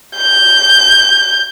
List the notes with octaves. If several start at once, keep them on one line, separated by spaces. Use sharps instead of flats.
G6